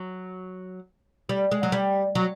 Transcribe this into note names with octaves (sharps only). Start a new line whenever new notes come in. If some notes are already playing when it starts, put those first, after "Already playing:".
Already playing: F#3
G3
G#3
F#3
G3
F#3